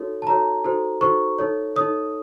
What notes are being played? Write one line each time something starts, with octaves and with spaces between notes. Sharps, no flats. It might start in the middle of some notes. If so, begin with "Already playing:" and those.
Already playing: D#4 F#4 A4 C#5
A5
D#4 F#4 A4 C#5 A#5
D#4 F#4 A4 C5
D#4 F#4 A4 C5 C#6
D#4 A4 C#5
D#4 A4 C#5 D#6